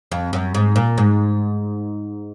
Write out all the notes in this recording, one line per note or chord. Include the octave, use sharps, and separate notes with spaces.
F2
F#2
G#2
A#2
G#2